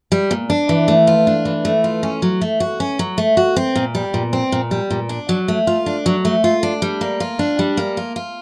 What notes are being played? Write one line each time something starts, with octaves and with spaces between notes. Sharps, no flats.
G3
A#2
D4
E3
A3
F4
D4
E3
A3
F4
C#4
F#3
A3
F#4
C#4
F#3
A3
F#4
C4
A#2
G3
A#2
C4
A#2
G3
A#2
D4
F#3
A3
F4
D4
F#3
A3
F4
D4
G3
A#3
F4
D4
G3
A#3
F4
F4